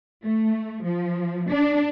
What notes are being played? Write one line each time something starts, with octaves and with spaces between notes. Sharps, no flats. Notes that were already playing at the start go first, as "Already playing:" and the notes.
A3
F3
D4